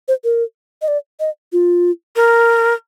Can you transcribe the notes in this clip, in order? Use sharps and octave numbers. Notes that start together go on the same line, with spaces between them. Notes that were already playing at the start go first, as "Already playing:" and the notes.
C5
A#4
D#5
D5
D#5
F4
A#4